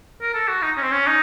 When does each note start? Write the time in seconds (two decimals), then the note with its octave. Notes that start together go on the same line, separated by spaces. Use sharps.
0.22 A#4
0.34 A4
0.48 F#4
0.62 D#4
0.77 C#4
0.82 C4
0.91 C#4
1.07 D#4